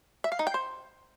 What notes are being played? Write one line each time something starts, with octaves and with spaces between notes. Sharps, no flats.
E5
F5
D#4
G5
C5